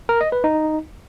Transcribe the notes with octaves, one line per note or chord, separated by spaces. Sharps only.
A#4
D#5
B4
D#4